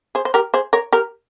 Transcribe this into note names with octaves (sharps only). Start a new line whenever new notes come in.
G#4 C5
C5
G4 A#4
G#4 C5
A#4 C#5
G4 A#4